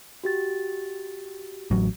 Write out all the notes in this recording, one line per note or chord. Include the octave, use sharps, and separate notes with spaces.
F#4 G4 A6
A1 F#3